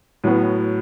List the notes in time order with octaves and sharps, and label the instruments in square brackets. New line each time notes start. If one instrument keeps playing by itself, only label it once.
[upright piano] A2 F#3 B3